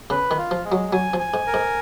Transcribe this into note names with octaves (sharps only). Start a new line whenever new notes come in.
C#3 B4
D#3
F4
F3
G#3
F#3
F#3 G#5
F3
G#5
G#2
A#4
G#2